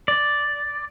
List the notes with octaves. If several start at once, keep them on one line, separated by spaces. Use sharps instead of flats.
D5